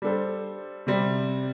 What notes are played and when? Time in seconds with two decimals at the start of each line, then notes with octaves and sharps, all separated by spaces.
0.02 G3 D4 A4 C5
0.87 C3 G3 C4